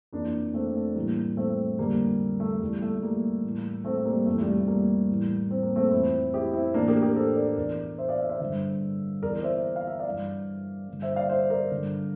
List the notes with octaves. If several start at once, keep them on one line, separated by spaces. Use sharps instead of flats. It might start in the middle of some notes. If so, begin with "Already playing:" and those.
F2 E3 A#3 D4
A3 C4
A3
A2 E3 G3 A#3
A3 C4
F2 D3 G3 A#3
A3
E2 E3 G3
A3
G3 A#3
A2 E3
A3 C4
G3 A#3
F2 C3 E3 A3
G3
A3
G3 A#3
A2 E3
C4
A#3
A3 C4
F2 E3 C4 E4
E4 G4
C4 E4
A2 E3 A#3 D4
G4 A#4
G4 A#4
A4 C5
A#4 D5
E2 E3 A#4 D5
C5 E5
D5 F5
C5 E5
C5 E5
G2 D3
E2 E3 A#4 D5
D5
C5 E5
F5
E5
D5 F5
G2 E3
G2 D3
C5 E5
D5 F5
C5 E5
A#4 D5
G2 D3